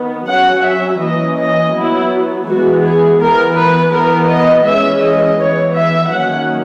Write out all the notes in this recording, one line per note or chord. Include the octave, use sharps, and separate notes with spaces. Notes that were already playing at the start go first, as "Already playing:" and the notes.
Already playing: D#3 B3
F#3 C#4 F#5
E5
E3 A#3 C#4 D#5
D#5
F#3 B3 E4
E3 G#3 B3 F#4
G#4
E3 B3 A#4
B4
E3 B3 A#4
D#5
E3 G#3 C#4 E5
D#5
E3 B3 C#5
E5
D#3 F#3 A#3 C#4 F#5